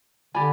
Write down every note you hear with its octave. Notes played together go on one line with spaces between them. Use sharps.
D3 G4 D5 G#5 B5